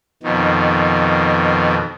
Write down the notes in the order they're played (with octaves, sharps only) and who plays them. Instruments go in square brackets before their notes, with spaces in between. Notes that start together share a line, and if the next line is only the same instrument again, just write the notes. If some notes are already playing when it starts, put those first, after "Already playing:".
[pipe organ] F2 B2 D#3